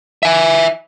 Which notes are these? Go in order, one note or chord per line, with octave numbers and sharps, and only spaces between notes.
E5 G#5